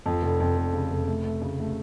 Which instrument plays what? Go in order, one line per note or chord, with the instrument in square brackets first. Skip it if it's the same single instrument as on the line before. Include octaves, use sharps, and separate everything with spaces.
[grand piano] F2
F1
F2
F1
C#3
F1
A3
A3
C#3
A3